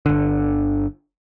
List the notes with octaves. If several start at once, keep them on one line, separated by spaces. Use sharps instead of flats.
G1 D3